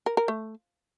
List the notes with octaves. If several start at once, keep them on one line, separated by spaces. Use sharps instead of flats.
A#4
A#4
A3